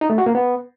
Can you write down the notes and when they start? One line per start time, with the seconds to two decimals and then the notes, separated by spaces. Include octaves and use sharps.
0.01 D#4
0.10 A3
0.18 F#4
0.26 A#3
0.35 B3